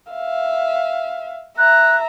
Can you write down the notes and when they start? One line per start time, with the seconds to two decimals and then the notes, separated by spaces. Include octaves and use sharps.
0.12 E5 F5
1.58 E5 A#5 F#6